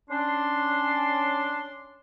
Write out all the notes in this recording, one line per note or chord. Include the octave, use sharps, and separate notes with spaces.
C#4 D4 C6